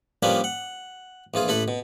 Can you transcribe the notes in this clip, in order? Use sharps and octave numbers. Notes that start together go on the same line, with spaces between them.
F3 G3 A#3 C#4 D4 B4
F#5
A#1 E3 F4 G#4
A1 E4 A4 B4 B5
B2